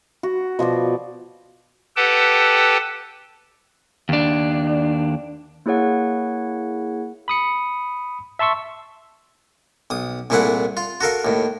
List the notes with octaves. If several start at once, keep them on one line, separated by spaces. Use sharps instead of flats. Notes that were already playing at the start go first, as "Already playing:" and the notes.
F#4
B2 F3 F#4 D5
G4 A4 B4 F#5 G5 A5
D#2 D4
A#3 E4 G#4 C#5 F#5
B5 D#6 C#7
E5 A5 C6 C#6 E6
B1 D#6
C2 A#2 A3 E4 G#4 F#5
F4
F#4 A4 A#4 F5
D#2 A2